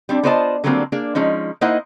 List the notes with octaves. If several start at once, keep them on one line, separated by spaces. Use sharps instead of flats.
G3 C4 D4
B3 F4 C5 D5 D#5 A5
D3 F#3 G3 A#3 C4 D4
A#3 D4 G#4
F3 G#3 C#4 D#4
A#3 D#4 E4 C5 D#5 F#5